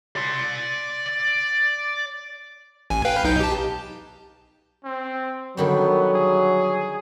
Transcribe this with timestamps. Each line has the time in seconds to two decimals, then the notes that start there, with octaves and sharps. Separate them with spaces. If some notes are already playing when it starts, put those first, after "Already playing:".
0.16 D5 C6
2.90 A1 G#5
3.05 B4 F5 G5
3.24 B1 D#4 G6
3.40 G4 A5
4.85 C4
5.57 D3 D#3 F#3 G3 B3
6.14 G#4